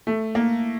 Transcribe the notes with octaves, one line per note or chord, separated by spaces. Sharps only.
A3
A#3